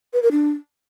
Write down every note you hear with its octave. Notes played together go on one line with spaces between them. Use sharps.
B4
A#4
D4